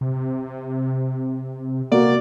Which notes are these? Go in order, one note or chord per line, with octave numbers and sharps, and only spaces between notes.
C3
A#3 F#4 D5